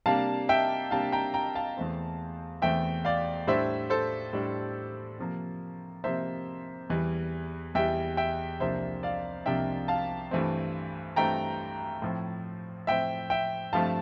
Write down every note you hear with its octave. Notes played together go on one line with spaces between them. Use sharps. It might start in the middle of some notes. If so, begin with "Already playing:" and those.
C3 G3 A#3 D4 F5 A5
E5 G5
C3 G3 A#3 D4 F5 A5
G5 A#5
G5 A#5
F5 A5
E2 E3 A3 C4
E2 E3 A3 C4 E5 G5
D5 F5
A2 G3 D4 C5 E5
A4 C5
A2 G3 D4
C3 F3 A#3
C3 F3 A#3 C5 E5
E2 E3 G3
E2 E3 G3 E5 G5
E5 G5
C2 C3 F3 A#3 D4 C5 E5
D5 F5
C2 C3 F3 A#3 D4 E5 G5
F5 A5
G2 E3 A3 C4
G2 E3 A3 C4 G5 A#5
A2 F3 C4
A2 F3 C4 E5 G5
E5 G5
G2 F3 A3 C4 F5 A5